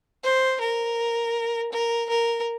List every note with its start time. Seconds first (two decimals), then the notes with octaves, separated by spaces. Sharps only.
0.23 C5
0.60 A#4
1.72 A#4
2.09 A#4